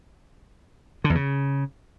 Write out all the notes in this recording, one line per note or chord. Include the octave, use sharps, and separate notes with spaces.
D3
E2
C#3